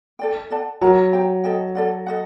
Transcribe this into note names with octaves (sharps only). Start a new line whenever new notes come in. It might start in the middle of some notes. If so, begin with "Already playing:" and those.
A4 D5 G5
A4 D5 F#5 A5
F#3 A#4 F#5 A#5
G4 C5 G5 A#5
A4 D#5 G5
A4 D5 F#5
A4 D#5 F#5